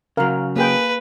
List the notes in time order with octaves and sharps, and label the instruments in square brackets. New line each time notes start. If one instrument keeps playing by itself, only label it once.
[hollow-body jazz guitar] C#3 F#3 [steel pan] A#4 F5
[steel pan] A#3 G#4 G5 [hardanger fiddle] B4